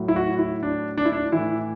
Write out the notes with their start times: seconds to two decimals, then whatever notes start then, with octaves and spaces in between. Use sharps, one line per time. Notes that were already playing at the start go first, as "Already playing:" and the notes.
Already playing: A2 F#3
0.08 E4
0.16 F#4
0.39 E4
0.63 D4
0.98 D4
1.05 E4
1.12 D4
1.32 A2 E3 E4